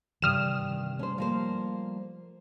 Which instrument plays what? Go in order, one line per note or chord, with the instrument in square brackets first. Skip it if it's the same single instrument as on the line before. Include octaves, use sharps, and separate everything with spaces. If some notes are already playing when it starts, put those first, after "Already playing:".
[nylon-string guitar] G2 [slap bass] C3 D#3 E3 [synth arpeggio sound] D#6 F6 E7
[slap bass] G3 A3 [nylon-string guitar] C#4 C5
[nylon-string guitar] F3 A#3 C5